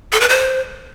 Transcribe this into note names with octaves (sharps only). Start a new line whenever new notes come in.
A4
B4
C5